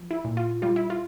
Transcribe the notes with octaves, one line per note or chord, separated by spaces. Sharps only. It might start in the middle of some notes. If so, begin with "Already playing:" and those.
Already playing: F3
E4
A#2
F4
G3 F4
E4
F4